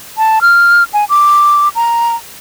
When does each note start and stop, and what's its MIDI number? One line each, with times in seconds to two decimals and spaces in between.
0.18 0.39 81
0.42 0.83 89
0.93 1.05 80
1.09 1.69 86
1.75 2.15 82